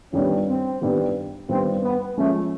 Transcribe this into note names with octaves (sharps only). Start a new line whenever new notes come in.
G2 D#3 G3 B3 C#4 D4
C4
G2 D#3 G3 B3 D4
G2 D#3 G3 B3 C4 D4
B3
F3 G#3 A3 C#4